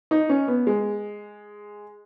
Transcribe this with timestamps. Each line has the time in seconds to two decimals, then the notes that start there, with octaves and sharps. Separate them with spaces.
0.11 D#4
0.29 C#4
0.48 B3
0.67 G#3